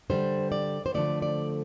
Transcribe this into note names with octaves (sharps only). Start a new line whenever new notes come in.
D3 G3 C5
D5
C5
D3 F3 A3 D5
D5